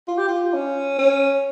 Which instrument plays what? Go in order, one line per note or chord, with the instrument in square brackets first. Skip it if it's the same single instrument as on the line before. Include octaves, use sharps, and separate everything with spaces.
[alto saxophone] F4
G4
F4
C#4
C#4